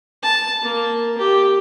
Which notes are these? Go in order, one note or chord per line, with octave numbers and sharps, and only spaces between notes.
A5
A#3
G4